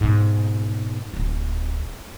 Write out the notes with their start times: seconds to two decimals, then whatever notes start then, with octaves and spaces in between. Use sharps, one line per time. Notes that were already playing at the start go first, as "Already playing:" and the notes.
0.01 G#2 B2
1.14 D1 E4